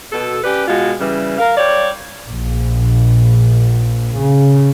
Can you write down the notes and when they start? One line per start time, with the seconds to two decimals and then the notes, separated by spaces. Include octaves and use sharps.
0.12 B2 A4
0.44 C#4 G4 B4 D5
0.67 B2 G#3 F4 F#4
1.00 C#3 E3 G3
1.38 A#4 F5
1.57 G3 C#5 D5
2.27 A#1
4.17 C#3